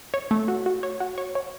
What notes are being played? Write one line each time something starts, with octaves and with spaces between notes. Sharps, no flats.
C#5
A3
F#4
F#4
C#5
F#4
C#5
C#5